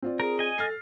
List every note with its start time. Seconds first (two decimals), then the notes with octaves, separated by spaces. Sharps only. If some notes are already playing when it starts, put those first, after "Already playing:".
0.02 C4 F4 D5
0.20 G#4 A#4
0.39 D#5 G#5
0.58 A4 F6 A6 C7